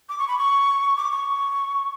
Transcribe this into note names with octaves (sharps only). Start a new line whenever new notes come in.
D6
C#6
B5
C#6
D6
C#6